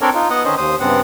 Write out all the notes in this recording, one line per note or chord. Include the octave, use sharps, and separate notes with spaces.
C4 D4 A4 A#4 C#5 D5
D#4 F4
B3 D#5 F#5
D3 D#3 C#4 C5 D#5
D#2 C5 D#6
G2 C#3 B3 C4 F#5